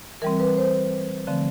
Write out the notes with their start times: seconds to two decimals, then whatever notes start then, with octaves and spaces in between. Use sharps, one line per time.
0.22 E3 G3 C4 A#4
0.40 B4
0.57 C5
1.27 D3 F3 A3 C4